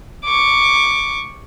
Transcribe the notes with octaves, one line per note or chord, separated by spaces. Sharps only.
C#6 D6